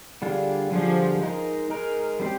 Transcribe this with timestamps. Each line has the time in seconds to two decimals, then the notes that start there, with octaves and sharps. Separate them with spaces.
0.22 D3 G3 D4 F4 G#4
0.71 D3 F3 G3 D4 F4 G#4
1.21 G#3 D#4 A#4
1.70 G#3 D#4 A#4
2.20 G3 C4 G4 C5